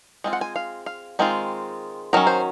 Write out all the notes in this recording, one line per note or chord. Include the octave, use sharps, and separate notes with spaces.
G#3 C4 F4
F#5
G#5
F5
F5
D#3 G#3 C4 F4
D#3 F#3 C#4 A#4
C5